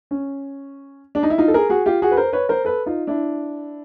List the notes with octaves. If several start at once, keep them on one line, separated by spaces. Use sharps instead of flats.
C#4
D4
D#4
E4
D#4 F4
A4
G#4 A#4
F#4 G#4
F4 G4
F#4 G#4
B4
A#4 C5
B4 C#5
A#4 C5
A4 B4
D#4 F4
D4 E4